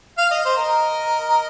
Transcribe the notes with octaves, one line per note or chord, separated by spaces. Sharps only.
F5
D#5
C5
A#4 D#5